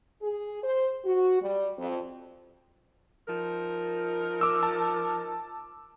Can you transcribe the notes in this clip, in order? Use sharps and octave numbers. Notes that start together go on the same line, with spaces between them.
G#4
C5
F#4
G3
F2
F3 D#4 A#4
D6 E6
A5